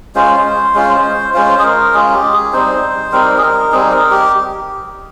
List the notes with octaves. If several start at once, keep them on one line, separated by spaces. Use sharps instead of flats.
G#3 C#4 F4 C5
G#3 C#4 F4
G#3 C#4 F4 C5
G#4
A#4
G#3 C#4 F4 G#4
G4
G#4
G3 C4 D#4 C5
G3 C4 D#4 A#4
G#4
A#4
G3 C4 D#4 G#4
A#4
G4